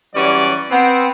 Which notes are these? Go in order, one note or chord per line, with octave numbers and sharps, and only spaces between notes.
E3 F#3 G3 C#4 B4 D5
B3 C4